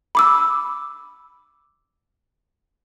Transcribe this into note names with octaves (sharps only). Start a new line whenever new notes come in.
B5 D6 E6